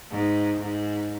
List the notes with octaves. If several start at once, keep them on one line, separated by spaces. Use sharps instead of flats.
G#2
G#2